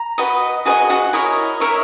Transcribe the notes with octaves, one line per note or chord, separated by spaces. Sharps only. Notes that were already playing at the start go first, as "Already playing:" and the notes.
Already playing: A#5
F#4 B4 D#5
F#4 G#4 B4 D#5 G#5
F#4 F#5
E4 A#4 C#5 D#5
E4 A#4 C#5 E5